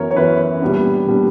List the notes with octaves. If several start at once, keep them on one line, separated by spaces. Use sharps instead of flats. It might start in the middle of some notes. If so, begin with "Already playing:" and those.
Already playing: F#2 E3 B3 A#4 C#5
C#5
F#2 E3 B3 B4
A#2 G3 B3 D4
A#2 G3 B3 D4